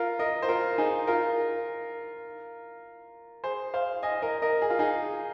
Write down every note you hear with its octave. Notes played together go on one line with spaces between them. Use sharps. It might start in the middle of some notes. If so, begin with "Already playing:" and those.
Already playing: F4 A#4
A#4 D#5
C5
F4 A#4
D#4 G#4
F4 A#4
G#4 C5
C5 F5
D#5 G#5
A#4 D#5
A#4 D#5
G#4
F4
D#4 G#4